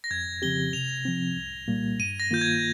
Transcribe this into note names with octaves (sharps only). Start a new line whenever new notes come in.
A#6
F2 G#6
C#3 F3 C4 G4 G7
C3 F7
F3 C4
C2
A#2 G3 A#3
G2 D#7
A#6
D#3 A#3 F4 G6
G#6